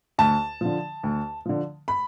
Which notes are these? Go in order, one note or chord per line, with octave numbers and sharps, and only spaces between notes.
D2 A5
D3 F3
D2
D3 F3
B5